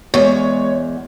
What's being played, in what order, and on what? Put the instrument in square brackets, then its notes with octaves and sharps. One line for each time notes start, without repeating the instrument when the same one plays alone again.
[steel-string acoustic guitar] E2 [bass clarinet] G#3 [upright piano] C#5